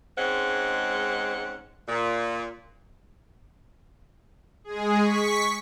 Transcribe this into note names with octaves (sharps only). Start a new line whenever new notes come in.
G#2 G#3 C4 C#4 F#5
A#2
G#3 G#4
C#6 B6